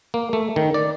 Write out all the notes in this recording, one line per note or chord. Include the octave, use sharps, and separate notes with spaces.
A#3
A3
D#3
D5